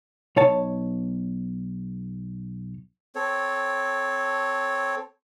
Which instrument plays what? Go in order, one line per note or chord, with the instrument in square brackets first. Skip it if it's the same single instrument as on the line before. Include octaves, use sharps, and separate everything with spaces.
[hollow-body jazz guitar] B1 C#5 A5
[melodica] C4 A4 C#5